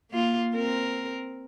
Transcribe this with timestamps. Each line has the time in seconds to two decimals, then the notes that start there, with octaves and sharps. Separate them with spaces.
0.11 A#3 F4
0.55 C4 A#4